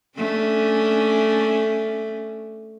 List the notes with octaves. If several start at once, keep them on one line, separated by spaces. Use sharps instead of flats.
A3 C#4 D4